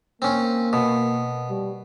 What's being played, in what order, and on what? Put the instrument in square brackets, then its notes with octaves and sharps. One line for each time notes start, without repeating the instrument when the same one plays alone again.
[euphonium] A#3 [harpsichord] C4 C#4
[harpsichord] B2
[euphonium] G3